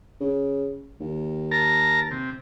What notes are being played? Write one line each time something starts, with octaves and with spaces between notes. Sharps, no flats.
C#3
D#2
A#4 A5 A#5
C3